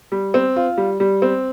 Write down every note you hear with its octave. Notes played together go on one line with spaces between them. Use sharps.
G3
C4
F4
G3
G3
C4